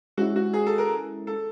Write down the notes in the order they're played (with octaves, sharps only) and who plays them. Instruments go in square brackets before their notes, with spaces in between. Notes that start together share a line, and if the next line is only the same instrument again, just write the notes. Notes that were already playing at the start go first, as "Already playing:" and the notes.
[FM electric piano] G#3 C#4 E4 [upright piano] F#4
[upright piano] F#4
G#4
A4
A#4
A4